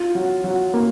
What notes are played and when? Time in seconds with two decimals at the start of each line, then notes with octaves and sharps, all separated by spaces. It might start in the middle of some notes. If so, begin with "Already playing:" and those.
Already playing: F4
0.15 F#3
0.44 F#3
0.74 A#3